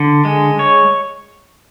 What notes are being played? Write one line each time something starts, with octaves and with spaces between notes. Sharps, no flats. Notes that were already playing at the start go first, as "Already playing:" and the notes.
Already playing: D3
G#3
C#5